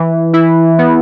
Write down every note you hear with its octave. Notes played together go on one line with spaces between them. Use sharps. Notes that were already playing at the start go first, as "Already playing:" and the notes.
Already playing: E3
E4
B3